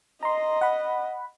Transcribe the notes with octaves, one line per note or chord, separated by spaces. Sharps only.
D#5 A#5 C6
F#5 B5